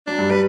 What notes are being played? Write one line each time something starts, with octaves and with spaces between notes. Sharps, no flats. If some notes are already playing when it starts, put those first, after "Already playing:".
F#3 D4
G2 G3
G3 B4